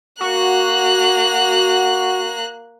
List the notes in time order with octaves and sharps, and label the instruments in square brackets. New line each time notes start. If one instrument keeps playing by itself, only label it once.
[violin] A#3 F#6 [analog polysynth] F#4